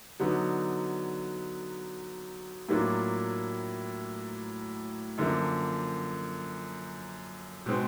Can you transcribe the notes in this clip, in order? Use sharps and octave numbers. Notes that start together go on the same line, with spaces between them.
D3 F#3 B3 D#4
A2 F#3 A#3 D4 F4
F#2 D3 F3 A#3
B2 G#3 C4